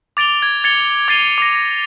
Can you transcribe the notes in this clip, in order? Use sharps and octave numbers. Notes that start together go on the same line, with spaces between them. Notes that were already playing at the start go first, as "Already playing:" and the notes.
D6 A6 D7 F7 G7
G#6
G#6 A6 C#7 F7 G7
D6 G#6 A6 C7 D#7 G7
D6 A#6
A#6